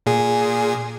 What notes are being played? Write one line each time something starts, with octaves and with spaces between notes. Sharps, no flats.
A#2 G#4